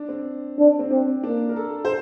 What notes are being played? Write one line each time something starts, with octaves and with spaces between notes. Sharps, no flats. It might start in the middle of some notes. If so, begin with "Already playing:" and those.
Already playing: D4
C4
D4
C4
C4 D4
A#3 D4
A#4
A4
C5